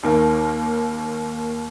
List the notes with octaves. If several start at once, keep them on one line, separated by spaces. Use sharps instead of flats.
D#2 D#3 A#3